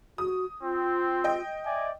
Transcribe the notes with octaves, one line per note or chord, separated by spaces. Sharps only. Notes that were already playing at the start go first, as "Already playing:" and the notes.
F#4 D#6
C4 F4
D#5 G5
D5 E5 G#5